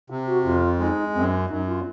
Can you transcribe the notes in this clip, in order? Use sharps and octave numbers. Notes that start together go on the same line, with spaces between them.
C3
F#4
F2 F4
G#3 D#4
F#2 C4
C#4
F#2 D#4
F4